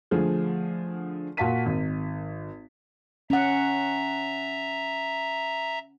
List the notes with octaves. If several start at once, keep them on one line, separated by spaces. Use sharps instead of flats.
D3 F3 A3 G#4
A#2 F#4 F5 A5 B6 D#7
G#1
C#4 E5 F#5 A#5